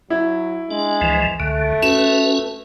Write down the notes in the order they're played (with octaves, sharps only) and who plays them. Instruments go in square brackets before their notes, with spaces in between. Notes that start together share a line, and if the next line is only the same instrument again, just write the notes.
[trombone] F#3 [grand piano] E4
[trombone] G#3 [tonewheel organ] D4
[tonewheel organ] C#2 E3 F3
[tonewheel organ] C#2 D3 [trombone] A3
[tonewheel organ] C#4 F#4 B4 [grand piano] E7